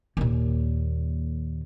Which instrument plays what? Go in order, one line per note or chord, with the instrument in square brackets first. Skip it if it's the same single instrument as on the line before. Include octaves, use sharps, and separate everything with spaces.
[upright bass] D#2 A#2